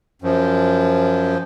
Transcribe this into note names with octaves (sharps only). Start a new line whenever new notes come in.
F#2 F3